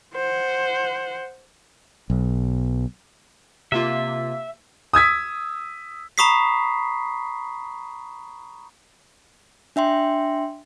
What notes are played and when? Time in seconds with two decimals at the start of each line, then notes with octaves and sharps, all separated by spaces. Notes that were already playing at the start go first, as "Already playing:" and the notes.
0.14 C5 F#5
2.10 B1
3.72 C3 A#3 F4 E5
4.93 D#6 E6 G#6 B6
6.18 A#5 B5 C#6 D#6 B6 C7
9.76 D4 E5 G5 C6